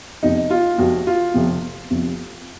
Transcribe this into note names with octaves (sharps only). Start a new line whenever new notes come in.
F1 F2 C3 D#4
F4
F1 F2 C3 F#4
F4
F1 F2 C3
F1 F2 C3